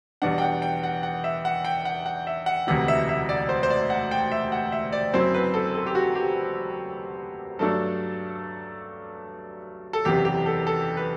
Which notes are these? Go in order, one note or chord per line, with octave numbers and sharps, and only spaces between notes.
E2 B2 G3 D4 F#5
G5
F#5
G5
F#5
F#5
E5
F#5
G5
F#5
F#5
E5
F#5
E1 D2 C3 E3 F#5
E5
E5
D5
C5
C5
D5
F#5
G5
E5
F#5
E5
D5
F#1 F#2 F#3 C4 E4 C5
B4
A4
A4
G4
F#4
G4
G2 F#3 A3 D4 A4
A4
F#1 E2 C3 E3 G4
G4
A4
A4
B4